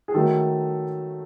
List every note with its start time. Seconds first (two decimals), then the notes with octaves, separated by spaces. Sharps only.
0.08 G#4
0.14 D#3 F#3 A3 A4